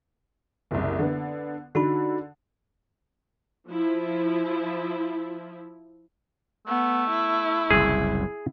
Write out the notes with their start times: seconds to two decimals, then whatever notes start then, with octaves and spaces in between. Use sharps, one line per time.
0.71 F#1 C2
0.99 D3 B3
1.75 D3 D#4 F#4 B5
3.69 F3 E4
6.68 A3 B3
7.11 E4
7.70 F#1 C2 F#2 G#4